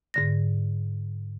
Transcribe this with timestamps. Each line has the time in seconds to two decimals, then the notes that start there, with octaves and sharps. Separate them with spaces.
0.14 G#2 D3 A#6